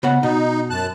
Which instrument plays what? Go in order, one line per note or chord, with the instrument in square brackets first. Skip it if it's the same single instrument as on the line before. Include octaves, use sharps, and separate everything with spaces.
[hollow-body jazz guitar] C#3 B3 F#5
[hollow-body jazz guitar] B2 [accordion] D#4
[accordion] F#2 A5 F#6